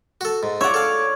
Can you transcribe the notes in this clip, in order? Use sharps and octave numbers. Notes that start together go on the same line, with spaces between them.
F#4 A4
G#2
C#5 D5 E5 F#5
A4 F5